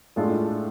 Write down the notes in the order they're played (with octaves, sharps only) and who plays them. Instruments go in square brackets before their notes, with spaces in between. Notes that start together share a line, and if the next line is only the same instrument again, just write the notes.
[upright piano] A2 G#3 D4 F4 A4